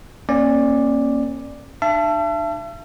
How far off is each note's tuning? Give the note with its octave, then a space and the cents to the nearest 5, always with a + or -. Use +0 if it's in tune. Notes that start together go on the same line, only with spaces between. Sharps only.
A#3 +15 C#4 -25 D5 +5
D4 +40 E5 +45 A5 +0